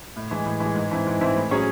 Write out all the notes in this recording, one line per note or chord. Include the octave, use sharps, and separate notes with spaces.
A2
E3 G#3
A2
E3
G#3
G#2
E3 C4 E4
G#2
E3 C4 E4
A2
F#3 C#4 G#4 C#5